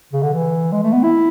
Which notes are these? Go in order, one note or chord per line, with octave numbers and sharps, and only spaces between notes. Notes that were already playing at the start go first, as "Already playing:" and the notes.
C#3
D3
E3
G#3
A3
B3
E4